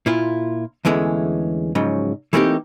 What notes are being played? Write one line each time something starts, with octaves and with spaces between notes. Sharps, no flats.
A#2 E4 F4
E2 D3 E3 G#3 A3 C#4
G#2 C#3 F3 F#3
E3 A3 A#3 C4 D#4 G4